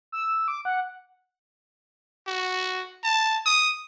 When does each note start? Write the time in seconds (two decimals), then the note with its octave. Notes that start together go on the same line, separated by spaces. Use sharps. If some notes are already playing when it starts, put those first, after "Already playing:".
0.12 E6
0.48 D6
0.65 F#5
2.27 F#4
3.03 A5
3.46 D#6